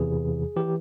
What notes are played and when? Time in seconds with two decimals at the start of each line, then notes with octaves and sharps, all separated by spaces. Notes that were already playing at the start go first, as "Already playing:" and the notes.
Already playing: E2 C3 E3 G#4
0.56 E3 G4